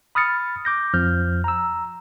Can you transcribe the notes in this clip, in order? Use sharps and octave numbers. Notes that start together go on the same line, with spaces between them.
B5 D#6 F6 A6 C#7
D6 G6 A#6
F2 F3 F6 G6
A#5 E6